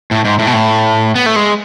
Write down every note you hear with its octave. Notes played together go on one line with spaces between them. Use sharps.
A2
G#2
A2
B2
A2
B3
A3
G#3